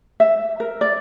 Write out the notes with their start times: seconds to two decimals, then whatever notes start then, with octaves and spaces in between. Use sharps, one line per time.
0.20 E5
0.60 A#4
0.81 D5